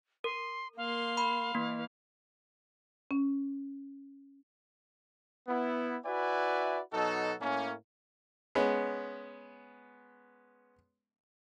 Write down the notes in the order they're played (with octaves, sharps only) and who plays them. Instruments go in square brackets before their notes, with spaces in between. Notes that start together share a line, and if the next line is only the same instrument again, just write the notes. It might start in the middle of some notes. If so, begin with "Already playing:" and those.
[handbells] A#4 [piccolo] C6
[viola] A#3 C6 [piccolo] F5
[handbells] B5
[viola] E3 [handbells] A#3
[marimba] C#4
[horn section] B3 E4
E4 F#4 B4 D5 E5 G#5
B2 F#3 D#4 F#4 A4
A2 A#3 C#4
[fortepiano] G#3 B3 C#4